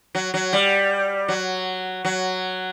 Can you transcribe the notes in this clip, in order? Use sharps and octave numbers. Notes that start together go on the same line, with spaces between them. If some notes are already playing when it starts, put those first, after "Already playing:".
F#3
F#3
G3
F#3
F#3